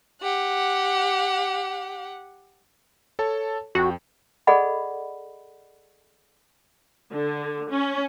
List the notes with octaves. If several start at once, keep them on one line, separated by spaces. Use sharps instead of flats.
G4 F#5
A4 C#5 A5
F2 F#4 G5
G#4 A4 D5 D#5 F#5 B5
D3
C#4